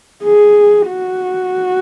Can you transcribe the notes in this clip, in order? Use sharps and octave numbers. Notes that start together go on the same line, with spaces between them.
G#4
F#4